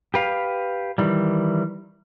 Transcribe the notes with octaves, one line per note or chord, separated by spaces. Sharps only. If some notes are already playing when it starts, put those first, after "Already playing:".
G4 B4 F5
D#3 E3 G3